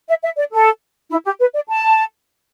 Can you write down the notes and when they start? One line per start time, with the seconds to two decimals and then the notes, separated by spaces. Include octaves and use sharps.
0.08 E5
0.22 E5
0.37 D5
0.52 A4
1.10 E4
1.25 G4
1.39 B4
1.54 D5
1.68 A5